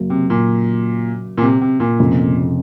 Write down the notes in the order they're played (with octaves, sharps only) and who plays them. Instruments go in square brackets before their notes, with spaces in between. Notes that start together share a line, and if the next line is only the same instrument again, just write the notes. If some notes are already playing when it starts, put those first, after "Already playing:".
Already playing: [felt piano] F#2 C#3 F#3 A#3
[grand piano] C3
A#2
A#2
C3
C3
A#2
[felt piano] F1 F2 C#3